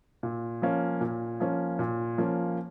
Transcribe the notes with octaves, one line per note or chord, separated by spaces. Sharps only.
A#2
F3 A#3 C#4
A#2
F3 A#3 C#4
A#2
F3 A#3 C#4